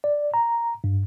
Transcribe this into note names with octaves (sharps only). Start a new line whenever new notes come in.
D5
A#5
G2